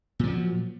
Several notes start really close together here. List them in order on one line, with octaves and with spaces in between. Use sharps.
A#2 F3 F#3